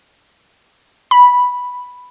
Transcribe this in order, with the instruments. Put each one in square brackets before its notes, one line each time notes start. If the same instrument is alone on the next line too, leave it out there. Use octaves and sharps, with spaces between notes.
[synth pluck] B5